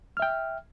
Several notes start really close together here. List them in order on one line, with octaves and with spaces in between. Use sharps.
F6 E5 G5